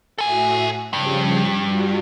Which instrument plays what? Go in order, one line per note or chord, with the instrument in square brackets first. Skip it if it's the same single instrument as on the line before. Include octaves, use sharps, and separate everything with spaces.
[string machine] A2 F#4 E5 [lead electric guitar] A4 G#5
[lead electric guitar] G2 [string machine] C#3 F3 G3
[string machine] G3 F4 F#4